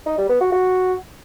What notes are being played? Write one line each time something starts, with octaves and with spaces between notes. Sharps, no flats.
D#4
G3
B3
F#4
F#4